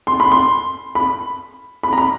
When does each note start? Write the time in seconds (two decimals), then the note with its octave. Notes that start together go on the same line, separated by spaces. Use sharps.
0.07 C6
0.20 B5
0.32 C6
0.95 B5
1.83 B5
1.93 A#5
1.98 B5